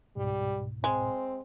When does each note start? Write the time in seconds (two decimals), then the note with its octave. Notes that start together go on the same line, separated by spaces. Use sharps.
0.16 C#2 G#2 B2 G3
0.84 G#3 C4